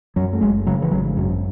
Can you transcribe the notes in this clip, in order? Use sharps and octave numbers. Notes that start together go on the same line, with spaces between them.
F#2 F#3
A3
F#1 G#3
C#3 F#3
E3
G#1 F#3
F#2 F#3